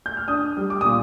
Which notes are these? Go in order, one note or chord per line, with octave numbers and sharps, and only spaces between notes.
G6
F6
D4 D#6
G3
D6
A#2 D#6